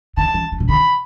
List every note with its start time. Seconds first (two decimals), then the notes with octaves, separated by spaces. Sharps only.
0.17 D3 A5
0.34 E3
0.52 E3
0.60 C3
0.68 D3 B5